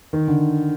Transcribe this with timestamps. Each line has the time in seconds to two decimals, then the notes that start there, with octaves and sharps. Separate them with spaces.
0.13 D#3
0.28 D3